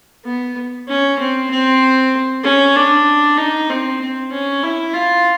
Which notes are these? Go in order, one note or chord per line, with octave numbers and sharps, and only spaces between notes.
B3
C#4
C4
C4
C#4
D4
D#4
C4
C4
C#4
E4
F4